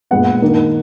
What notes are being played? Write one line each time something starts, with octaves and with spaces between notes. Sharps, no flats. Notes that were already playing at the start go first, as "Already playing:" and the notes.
A#2 G#3 B3 F#5
D#3 A#3 D#4